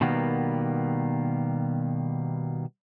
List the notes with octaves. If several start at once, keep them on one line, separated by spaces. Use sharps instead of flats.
B2 D#3 G3 A#3 B3